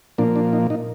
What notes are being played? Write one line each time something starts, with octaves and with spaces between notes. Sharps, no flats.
A#2 F3 A#3 D4
D4
D#4
D#4